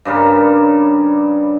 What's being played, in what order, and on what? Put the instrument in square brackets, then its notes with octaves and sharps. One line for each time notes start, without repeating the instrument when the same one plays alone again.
[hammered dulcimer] G2 C#3 G3 A#4